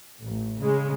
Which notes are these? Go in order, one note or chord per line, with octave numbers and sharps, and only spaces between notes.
A1
C#3 G#3